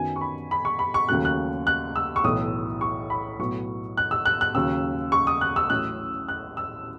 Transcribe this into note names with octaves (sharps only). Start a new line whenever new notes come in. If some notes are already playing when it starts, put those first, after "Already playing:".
Already playing: F#2 D#3 F#3 B3 G#5
C#6
B5
B5
C#6
B5
C#6
D#2 C#3 F#3 A3 F#6
F#6
F#6
E6
C#6
B1 A2 E3 D#6
C#6
B5
B1 A2 F#3 B3 C#6
F#6
E6
F#6
F#6
D#2 C#3 F#3 E6
C#6
D#6
F#6
E6
A1 A2 F#3 C#4 F#6
F#6
E6